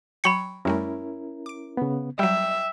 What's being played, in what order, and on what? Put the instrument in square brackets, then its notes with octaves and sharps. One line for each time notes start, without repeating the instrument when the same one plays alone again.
[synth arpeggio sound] F#3 G5 G#6 [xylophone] B5 C#6 C#7
[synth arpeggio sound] F#2 G3 A3 [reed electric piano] C#4 E4 A#4
[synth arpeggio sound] D6 D7
[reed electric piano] C#3 B3
[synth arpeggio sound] F#3 G3 [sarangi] E5 [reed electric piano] G5